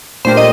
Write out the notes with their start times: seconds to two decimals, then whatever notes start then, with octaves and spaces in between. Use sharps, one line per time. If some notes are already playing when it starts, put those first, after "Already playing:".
0.25 A#2 A3 D4 G4 A#4 C5
0.37 D#5